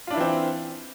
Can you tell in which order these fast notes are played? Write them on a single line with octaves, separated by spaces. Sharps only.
F4 D4 E4 E3 C4